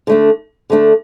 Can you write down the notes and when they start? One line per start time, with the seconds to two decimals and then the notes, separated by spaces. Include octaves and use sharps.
0.07 D3 A3 D4
0.70 D3 A3 D4